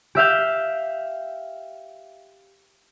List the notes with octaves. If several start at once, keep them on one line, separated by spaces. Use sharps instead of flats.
G4 E5 F5 G6